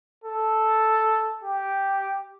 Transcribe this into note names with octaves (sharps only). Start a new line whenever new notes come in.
A4
G4